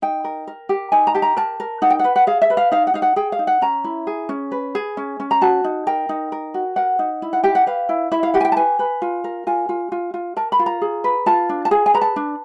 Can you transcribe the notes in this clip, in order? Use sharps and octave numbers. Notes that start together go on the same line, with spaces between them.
D#4 G5
A#4
A#4
G4
D#4 G#5
A#5
G4 A5
A#5
A#4 A5
A#4
D#4 F#5
G5
B4 F#5
F#5
G#4 F5
E5
B4
F5
D#4 F5
F#5
D#4 F5
F#5
G#4 G5
F5
D#4
F#5
C#4 A#5
E4
G#4
C#4
B4
G#4
C#4
C#4
A#5
F#4 A5
D#4
A#4 G5
D#4
A#4
F#4
A#4 F#5
D#4
E4
F#5
G4 G5
F#5
B4 F5
E4
E4 E5
F5
G4 F#5
G#5
G5
A5
B4 G#5
B4
F4
A#4
F4 G#5
F4
F4
F4
A#4 A5
B5
F4
A#5
G#4
B4
F4 A5
D4
A5
G#4 G#5
G#5
B4 A#5
A5
D4